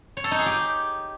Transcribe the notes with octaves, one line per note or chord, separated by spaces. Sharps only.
C#5
A4
D#4
G#4
G4